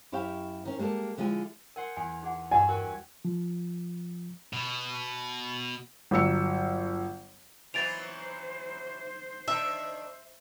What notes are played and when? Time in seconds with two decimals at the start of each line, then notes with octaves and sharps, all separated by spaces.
0.12 F#2 E4 G4 C#5 F5 G5
0.65 D#3 C#4
0.78 G3 G#3 A#3 G4 A4
1.18 D3 F3 G#3 E4 G#5
1.76 A#4 C5 F#5 G#5
1.97 E2 G#5
2.23 D#4 G#4 F#5
2.51 G2 G4 D5 F#5 G#5 E6
2.69 F#4 A#4 B4 G5
3.25 F3
4.53 B2
6.11 G1 F#3 E6 C#7
7.74 E3 F#3 B3 C5 A6 D7 F7
9.48 D#3 D4 E5